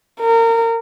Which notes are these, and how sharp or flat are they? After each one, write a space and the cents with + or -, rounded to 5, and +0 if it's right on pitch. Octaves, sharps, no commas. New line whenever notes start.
A#4 -30